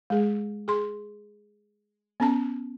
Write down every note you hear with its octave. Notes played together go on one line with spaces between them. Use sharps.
G#3 G#4
G#4 C6
B3 C#4 A5